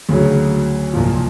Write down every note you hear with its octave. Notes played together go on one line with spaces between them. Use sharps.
D2 C#3 F#3
C2 A#2 F3